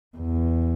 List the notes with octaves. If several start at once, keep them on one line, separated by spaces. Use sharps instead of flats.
E2